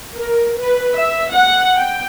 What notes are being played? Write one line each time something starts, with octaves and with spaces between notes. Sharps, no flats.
A#4
B4
E5
F#5
G5